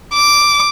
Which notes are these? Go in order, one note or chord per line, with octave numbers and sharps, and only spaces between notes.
D6